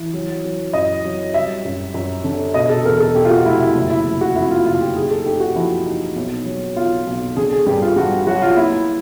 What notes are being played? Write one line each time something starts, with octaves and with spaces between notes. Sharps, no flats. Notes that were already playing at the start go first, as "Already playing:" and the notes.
Already playing: E3
F#3
F#3
F#2 D#5
F#3
G3 E5
F#2
F#2
D3
B2 D#5
A4
E2 A#4
A4
B2 G4
F4
F#4
F1 E4
E4
F#1
E4
F#1
F#4
F2 E4
F4
F#1 F4
G4
D#4 G#4
A4
D#4 G4
F#4
F3 E4
D#4
B1
F#3
B1 F4
B1
D3 G#4
G#4
G2 G4
F4
G2 F#4
F#3 F#4
F4
A#3 E4